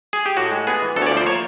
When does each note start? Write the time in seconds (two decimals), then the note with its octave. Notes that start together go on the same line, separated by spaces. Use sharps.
0.13 G#4
0.26 G4
0.37 A2 F#4
0.51 G#3
0.67 B3 G#4
0.82 E3
0.96 D2 A4
1.02 C#5
1.07 D5
1.11 F3
1.17 C5
1.26 A#3 C#5